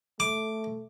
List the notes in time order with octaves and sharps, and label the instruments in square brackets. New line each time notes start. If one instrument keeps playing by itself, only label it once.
[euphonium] A3 [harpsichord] D6